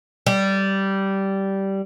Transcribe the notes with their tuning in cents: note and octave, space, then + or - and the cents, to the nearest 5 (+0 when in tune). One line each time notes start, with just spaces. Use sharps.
G3 -10